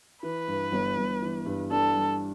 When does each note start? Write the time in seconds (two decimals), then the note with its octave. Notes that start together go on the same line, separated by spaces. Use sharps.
0.22 E3 B4
0.48 G2
0.72 G1
0.97 G1
1.22 E3
1.46 G2
1.71 D4 A4
1.96 G3